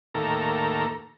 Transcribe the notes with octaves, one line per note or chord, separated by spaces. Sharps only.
D#2 A2 A#3 A4 A#5